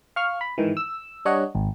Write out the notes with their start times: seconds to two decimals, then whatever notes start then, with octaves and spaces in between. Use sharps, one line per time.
0.16 F5 C#6 F6
0.41 B5
0.58 G#2 D#3 E3
0.77 E6
1.25 G3 D4 C#5 D#5 F#5
1.55 G#1